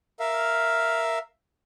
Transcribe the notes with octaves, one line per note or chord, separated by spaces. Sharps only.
A#4 E5 F5